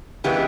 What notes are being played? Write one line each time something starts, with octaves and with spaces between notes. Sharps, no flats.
C#3 E3 G#3 B3 G4